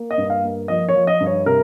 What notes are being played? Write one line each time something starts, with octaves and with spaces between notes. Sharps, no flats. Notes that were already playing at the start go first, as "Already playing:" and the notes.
Already playing: A#3
D#5
G2
F5
A#3
F3 D#5
C#5
F3
D#5
G2
C#5
C3 A#4